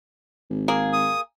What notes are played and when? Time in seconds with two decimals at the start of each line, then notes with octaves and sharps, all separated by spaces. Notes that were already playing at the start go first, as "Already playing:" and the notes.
0.50 G#1
0.68 A#3 G#4
0.93 D#6